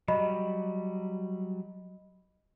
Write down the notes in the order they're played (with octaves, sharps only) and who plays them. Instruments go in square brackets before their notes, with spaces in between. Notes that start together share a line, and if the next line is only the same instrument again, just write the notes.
[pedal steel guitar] F#3 G3 [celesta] D#5 B5